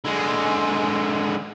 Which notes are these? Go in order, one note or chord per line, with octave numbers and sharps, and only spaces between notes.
D3 G#3